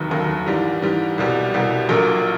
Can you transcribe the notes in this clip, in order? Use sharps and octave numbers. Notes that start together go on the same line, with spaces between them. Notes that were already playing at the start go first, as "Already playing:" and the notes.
Already playing: F1 D#2 D#3 F#3
F1 D#2 D#3 F#3
G#2 E3 G3
G#2 E3 G3
C2 B2 G3
C2 B2 G3
A#1 A#2 F#3 A#3